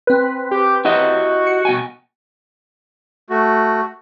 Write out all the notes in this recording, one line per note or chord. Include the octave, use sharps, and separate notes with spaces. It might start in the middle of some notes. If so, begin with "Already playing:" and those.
C4 B4
G4
E4 F#4 G4 D#5
C#7
B2 G5 G#5
A3 F#4